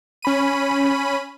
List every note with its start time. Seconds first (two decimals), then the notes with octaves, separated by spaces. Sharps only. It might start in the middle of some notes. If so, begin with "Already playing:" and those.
0.22 C#4 B5 D#7